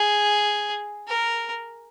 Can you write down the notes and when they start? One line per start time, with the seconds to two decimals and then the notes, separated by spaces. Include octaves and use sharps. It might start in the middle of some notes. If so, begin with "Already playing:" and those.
Already playing: G#4
1.08 A#4